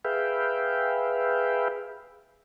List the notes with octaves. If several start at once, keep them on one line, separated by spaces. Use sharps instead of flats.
G#4 B4 E5 F5 G5